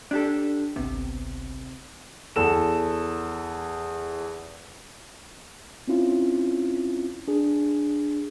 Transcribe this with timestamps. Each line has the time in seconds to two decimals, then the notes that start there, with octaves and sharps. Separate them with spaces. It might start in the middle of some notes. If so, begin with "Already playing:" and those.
0.11 D4 G4 A4
0.76 G#1 C#2 C3 B3
2.36 E2 A4 E7
5.88 C4 C#4 E4 F4
7.28 D4 G#4